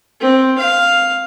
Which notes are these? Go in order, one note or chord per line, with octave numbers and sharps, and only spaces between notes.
C4
F5